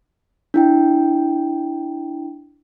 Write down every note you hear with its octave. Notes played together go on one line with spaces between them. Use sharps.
D4 E4 G5